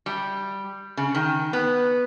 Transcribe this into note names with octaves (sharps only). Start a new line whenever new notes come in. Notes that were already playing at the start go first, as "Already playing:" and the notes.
G3
C#3
D#3
B3